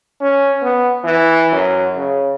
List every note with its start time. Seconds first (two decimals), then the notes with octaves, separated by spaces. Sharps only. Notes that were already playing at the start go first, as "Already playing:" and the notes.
0.21 C#4
0.62 B3
1.04 E3
1.52 F#2
1.97 C#3